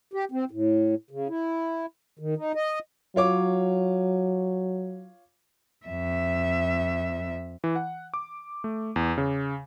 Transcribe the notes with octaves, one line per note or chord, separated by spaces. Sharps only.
G4
C4
A2
C#3
E4
D#3
D#4
D#5
F#3 F4 C#5 D6
F2 E5
E3
F#5
D6
A3
E2
C#3